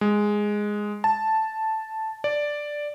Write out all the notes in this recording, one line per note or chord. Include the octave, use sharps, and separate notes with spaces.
G#3
A5
D5